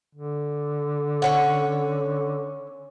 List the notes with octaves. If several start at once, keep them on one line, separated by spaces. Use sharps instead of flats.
D3
C#4 C#5 F#5